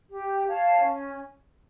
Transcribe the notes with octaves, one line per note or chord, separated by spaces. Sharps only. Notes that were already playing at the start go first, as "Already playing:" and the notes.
G4
C#5 F5 A5
C#4